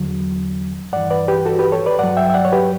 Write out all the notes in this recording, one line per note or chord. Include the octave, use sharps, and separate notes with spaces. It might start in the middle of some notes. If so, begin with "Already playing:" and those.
Already playing: E2 D3 F#3
G2 E3 D5 F#5
B4 D5
G4 B4
F#4 A4
G4 B4
A4 C#5
B4 D5
G2 F#3 D5 F#5
E5 G5
E5
D5 F#5
C#5
G4 B4